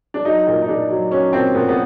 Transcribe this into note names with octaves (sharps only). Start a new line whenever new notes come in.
D4
F#3 D#4
A#2
D#4
A#2 D4
F#3
F#3 C#4
A#2 C4
A#2 B3
B3